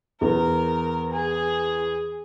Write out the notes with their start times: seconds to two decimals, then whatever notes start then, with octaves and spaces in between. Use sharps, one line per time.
0.21 E2 A#4
1.12 G#4